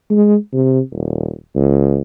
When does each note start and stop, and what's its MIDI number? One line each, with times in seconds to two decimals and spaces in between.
0.10 0.36 56
0.53 0.80 48
0.92 1.33 27
1.56 2.02 37